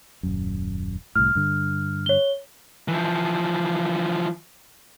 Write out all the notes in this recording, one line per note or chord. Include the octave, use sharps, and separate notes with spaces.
D#1 F#2
C2 A2 F6
G2 D3
C#5 G7
E3 F3